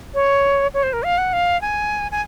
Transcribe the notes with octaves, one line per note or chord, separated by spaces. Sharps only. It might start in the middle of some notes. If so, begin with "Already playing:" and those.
C#5
C#5
C5
A#4
F5
F#5
F5
G#5
G#5